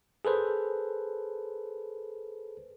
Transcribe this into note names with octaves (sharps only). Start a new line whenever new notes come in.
G#4 A4 B4 C5